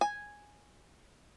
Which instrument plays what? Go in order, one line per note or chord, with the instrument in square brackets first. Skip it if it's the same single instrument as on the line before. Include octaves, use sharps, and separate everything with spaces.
[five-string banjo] G#5